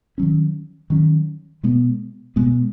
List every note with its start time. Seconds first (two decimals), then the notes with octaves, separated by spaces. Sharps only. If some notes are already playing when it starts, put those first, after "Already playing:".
0.18 D#3 F#3 C#4
0.90 D#3 F#3 C#4
1.63 B2 G#3 B3
2.36 B2 G#3 B3